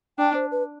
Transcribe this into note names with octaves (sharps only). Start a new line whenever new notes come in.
D4 G5
C5
B4